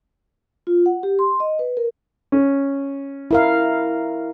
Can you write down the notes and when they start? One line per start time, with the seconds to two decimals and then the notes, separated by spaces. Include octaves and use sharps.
0.67 F4
0.86 F#5
1.03 G4
1.19 C6
1.40 D#5
1.59 B4
1.77 A#4
2.32 C#4
3.31 E4 A#4 F5